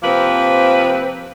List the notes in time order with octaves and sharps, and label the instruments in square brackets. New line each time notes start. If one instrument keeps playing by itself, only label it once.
[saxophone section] C3 F3 A#3 C4 B4